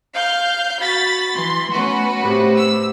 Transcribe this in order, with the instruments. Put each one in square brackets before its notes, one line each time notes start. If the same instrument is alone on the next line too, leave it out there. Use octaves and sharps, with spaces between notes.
[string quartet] F5 [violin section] F6 G6
[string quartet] F#4 [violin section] B5 A6 B6
[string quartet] E3 [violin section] C6
[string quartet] A3 B3 C#4 [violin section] F#4 B4
[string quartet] A2 C3
[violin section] E6